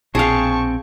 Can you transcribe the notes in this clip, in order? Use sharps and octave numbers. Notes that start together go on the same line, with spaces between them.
A#1 B2 C4 G#4 F5 G5 A5 C#6